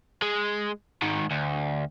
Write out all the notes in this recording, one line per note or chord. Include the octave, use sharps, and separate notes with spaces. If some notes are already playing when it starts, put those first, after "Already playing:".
G#3
G#2 D#3
D2